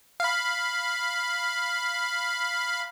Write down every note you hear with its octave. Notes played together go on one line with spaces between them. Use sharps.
F5 B5